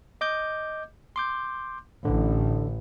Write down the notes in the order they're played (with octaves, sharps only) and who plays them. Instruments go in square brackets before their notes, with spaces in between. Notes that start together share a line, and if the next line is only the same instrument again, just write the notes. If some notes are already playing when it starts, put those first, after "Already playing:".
[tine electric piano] D#5 D6 G6
C6 D6 G6
[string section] A1 [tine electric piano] D3